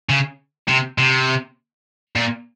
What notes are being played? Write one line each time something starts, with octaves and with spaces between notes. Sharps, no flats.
C#3
C3
C3
A#2